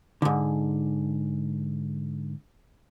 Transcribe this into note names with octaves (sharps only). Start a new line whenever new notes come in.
G#2 D3